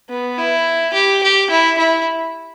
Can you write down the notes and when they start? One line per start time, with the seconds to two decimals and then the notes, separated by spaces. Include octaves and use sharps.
0.10 B3
0.38 E4
0.94 G4
1.23 G4
1.50 E4
1.78 E4